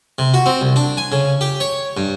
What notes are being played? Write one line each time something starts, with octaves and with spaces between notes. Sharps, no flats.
C3
F#4
C4
C2
D4
G#5
C#3
G4
C#5
G2